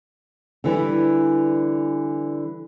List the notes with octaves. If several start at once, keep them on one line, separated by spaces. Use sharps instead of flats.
D3 E3 G3